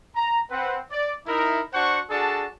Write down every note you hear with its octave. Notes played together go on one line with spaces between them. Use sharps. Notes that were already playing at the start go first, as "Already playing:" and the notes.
A#5
C4 B4 F#5
D5
D#4 E4 A#4
D4 F#4 C5 F#5 C#6
D4 F#4 G#4 A4 D5 A5